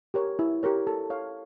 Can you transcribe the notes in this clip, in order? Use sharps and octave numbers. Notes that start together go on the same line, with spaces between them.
G4 A#4 C#5
E4
G4 A#4 C#5
A4
C#5 F5